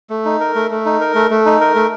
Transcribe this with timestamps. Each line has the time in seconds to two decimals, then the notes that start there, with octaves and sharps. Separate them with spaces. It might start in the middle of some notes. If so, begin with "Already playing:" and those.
0.10 A3
0.25 D#4
0.40 A#4
0.55 A3
0.71 A3
0.86 D#4
1.01 A#4
1.15 A3
1.31 A3
1.46 D#4
1.61 A#4
1.75 A3